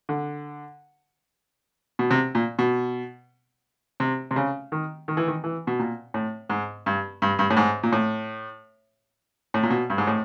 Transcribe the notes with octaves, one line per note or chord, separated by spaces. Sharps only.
D3
B2
C3
A#2
B2
C3
C3
C#3
D#3
D#3
E3
D#3
E3
B2
A#2
A2
G#2
G2
G2
G2
A2
G#2
A#2
A2
A2
A#2
B2
G2
G#2
A2